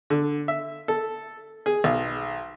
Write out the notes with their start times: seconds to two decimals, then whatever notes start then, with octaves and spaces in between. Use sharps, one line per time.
0.10 D3
0.48 E5
0.88 A4
1.66 G#4
1.84 B1